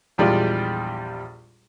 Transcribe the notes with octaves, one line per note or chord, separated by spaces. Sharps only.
A#1 E2 G3 G#3 F4 D5